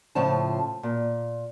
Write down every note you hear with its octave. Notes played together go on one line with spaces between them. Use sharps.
A2 C#3 F3 C5 A5
A#2